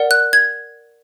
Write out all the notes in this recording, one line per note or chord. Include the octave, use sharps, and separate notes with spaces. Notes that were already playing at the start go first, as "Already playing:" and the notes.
Already playing: A#4 D5 F#5
F#6
G#6